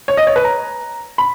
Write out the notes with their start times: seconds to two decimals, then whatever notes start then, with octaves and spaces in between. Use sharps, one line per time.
0.08 C#5
0.17 D#5
0.27 C#5
0.36 B4
0.44 A#5
1.18 B5